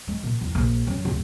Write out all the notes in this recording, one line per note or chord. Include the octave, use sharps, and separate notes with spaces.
G#3
A#2
E2
A#1
F#2
D1